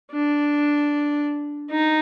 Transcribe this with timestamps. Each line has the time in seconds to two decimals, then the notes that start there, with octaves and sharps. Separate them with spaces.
0.12 D4
1.71 D#4